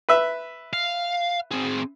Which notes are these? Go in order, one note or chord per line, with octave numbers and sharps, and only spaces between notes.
B4 E5
F5
C4 G#4